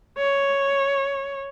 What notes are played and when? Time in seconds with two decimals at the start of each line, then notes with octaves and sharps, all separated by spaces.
0.19 C#5